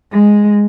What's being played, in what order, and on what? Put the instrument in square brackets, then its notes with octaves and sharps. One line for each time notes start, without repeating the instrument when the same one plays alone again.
[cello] G#3